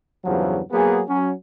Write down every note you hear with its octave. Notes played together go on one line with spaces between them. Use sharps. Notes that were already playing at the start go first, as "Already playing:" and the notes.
E2 G2 C#3 F3 F#3
F#3 A#3 B3 G#4
F#3 C#4